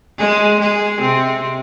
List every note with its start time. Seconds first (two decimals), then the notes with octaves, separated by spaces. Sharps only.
0.18 G#3 G#4
0.60 G#3 G#4
1.01 C3 C4